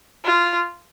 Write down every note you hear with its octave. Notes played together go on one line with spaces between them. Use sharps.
F4